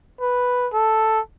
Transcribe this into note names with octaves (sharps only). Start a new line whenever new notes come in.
B4
A4